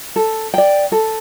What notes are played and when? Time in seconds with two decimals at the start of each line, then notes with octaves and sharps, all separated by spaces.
0.16 A4
0.54 D5 G5
0.92 A4